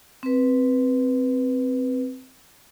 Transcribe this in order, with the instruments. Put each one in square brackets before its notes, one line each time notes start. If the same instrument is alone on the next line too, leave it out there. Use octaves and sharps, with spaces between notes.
[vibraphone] C4 B4